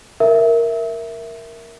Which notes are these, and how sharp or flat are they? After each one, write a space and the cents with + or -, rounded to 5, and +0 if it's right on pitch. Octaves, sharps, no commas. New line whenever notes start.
A#4 +0 E5 +0